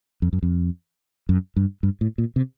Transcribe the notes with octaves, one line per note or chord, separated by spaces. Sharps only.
F2
F#2
F2
F#2
G2
G2
A2
A#2
C3